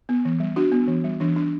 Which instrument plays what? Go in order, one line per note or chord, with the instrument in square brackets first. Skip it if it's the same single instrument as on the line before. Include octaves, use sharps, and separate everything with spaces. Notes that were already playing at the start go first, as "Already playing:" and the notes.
[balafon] B3
E3
G3
D4 F#4
B3
E3
G3
E3 D4
D4